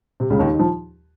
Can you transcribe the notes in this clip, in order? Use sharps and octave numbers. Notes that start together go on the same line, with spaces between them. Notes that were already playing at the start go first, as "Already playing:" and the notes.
C3
C#2 C#3
D#2 D#3
D#3
F3